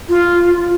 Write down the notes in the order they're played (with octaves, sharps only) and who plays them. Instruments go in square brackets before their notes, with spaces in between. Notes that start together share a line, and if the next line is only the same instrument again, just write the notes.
[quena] F4